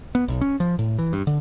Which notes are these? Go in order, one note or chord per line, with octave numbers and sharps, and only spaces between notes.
B3
B1
C#4
F3
A2
E3
G2
D3